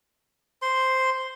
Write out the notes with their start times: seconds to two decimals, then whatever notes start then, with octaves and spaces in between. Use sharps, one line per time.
0.62 C5 C6